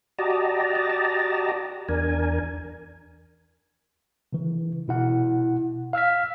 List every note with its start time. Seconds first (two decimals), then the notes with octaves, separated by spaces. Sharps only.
0.19 F#4 G4 D5 D#5 A5 A#5
1.89 E2 D4 A#4 G#5
4.33 C#3 E3
4.88 B2 E4 F#5
5.93 F5 E6 F6 B6